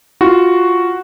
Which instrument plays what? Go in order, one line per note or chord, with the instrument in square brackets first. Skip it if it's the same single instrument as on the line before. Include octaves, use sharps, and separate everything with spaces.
[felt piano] F4 [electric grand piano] F#4